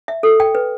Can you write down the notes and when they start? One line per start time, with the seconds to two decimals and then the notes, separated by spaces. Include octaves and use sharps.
0.08 E5
0.23 A4
0.40 G5
0.55 B4